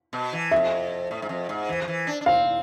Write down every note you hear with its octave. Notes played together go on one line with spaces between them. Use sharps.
B2
E3
F2 E5
A2
G#2
F2
G#2
E3
F3
E3
D4
D4
C4 F5